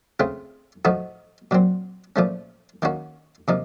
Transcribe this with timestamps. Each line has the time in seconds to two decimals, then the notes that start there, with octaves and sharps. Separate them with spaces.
0.20 C#3 A3 C4 F4
0.85 A2 F3 A3 D#4 F#4
1.51 A#2 F#3 C4
2.16 A#2 F3 A3 C#4
2.82 D#3 A#3 C#4 F#4
3.48 C3 F3 A#3 D#4